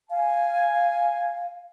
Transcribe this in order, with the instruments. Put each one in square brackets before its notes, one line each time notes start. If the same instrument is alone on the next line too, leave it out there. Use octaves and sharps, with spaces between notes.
[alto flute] F5 [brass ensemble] G#5